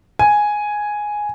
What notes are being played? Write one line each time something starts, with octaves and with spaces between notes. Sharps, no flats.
G#5